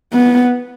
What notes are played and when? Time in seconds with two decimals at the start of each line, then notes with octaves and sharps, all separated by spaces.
0.13 B3